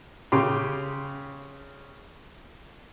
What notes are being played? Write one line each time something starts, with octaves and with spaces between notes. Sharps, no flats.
C#3 G4 C6